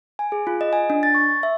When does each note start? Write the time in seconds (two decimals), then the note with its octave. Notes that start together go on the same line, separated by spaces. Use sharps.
0.19 G#5
0.32 G#4
0.47 F4
0.61 D#5
0.73 G#5
0.90 D4
1.03 A6
1.14 C#6
1.43 E5